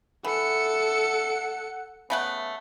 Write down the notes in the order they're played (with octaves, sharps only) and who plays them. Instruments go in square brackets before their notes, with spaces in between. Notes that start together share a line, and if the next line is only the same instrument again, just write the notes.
[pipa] E3 [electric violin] A4 C#7 [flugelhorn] F#5
[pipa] C#3 A3 F#5 [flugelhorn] B3